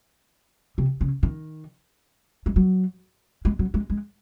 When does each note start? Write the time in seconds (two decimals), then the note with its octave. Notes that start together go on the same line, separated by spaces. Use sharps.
0.78 C3
1.01 C#3
1.23 D#3
2.46 G#3
2.56 F#3
3.45 G#3
3.59 F#3
3.74 G#3
3.90 G#3